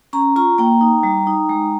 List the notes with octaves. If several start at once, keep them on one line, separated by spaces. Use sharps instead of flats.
C#4 A#5 C#6
F4 A#5 C#6
A#3 G5 A#5
D#4
G3
D#4
G#3